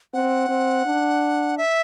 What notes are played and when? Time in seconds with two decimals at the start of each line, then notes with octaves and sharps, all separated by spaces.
0.14 C4 F#5
0.49 C4
0.86 D4
1.58 E5